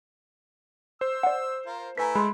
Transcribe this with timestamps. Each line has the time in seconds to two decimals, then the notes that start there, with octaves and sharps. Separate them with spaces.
1.01 C5 E6
1.23 D5 F#5
1.66 F4 A#4
1.98 A3 E4 A4 B4 G#5 A#5 B6
2.15 G#3 B5 C6